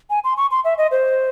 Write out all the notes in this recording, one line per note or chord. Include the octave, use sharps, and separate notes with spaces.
G#5
C6
C#6
C6
E5
D#5
C5